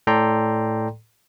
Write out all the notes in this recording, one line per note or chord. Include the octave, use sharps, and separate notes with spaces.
A2 A4 D5 G5 A#5 C6